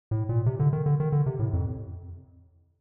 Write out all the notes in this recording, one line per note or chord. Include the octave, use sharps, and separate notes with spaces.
A2
A#2
C3
D3
D#3
D3
D#3
D3
C3
A2
F2